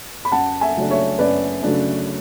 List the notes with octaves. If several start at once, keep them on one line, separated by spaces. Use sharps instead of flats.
B5
F#2 F#5 A5
E5 G#5
C#3 F#3 A3 D4
C#5 E5
F#2 B4 D5
C#3 F#3 A3 D4